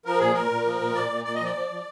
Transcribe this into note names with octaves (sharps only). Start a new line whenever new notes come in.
F3 A#4
A#2 G#4
A#2 A#4
A#2
F3
A#2
A#2 D5
A#2
A#2 D5
D#5
F3 D5
F3
F3